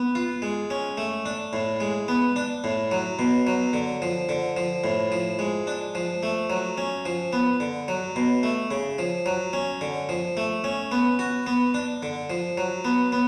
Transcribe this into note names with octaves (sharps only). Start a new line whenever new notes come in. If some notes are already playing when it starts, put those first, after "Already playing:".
Already playing: B3
F4
G#3
C#4
A3
D4
A2
G#3
B3
D4
A2
F#3
B2
F#3
D3
F3
D3
F3
A2
F3
G#3
D4
F3
A3
F#3
C#4
F3
B3
D3
F#3
B2
A3
C#3
F3
F#3
C#4
D3
F3
A3
C#4
B3
F#4
B3
D4
D3
F3
F#3
B3
B3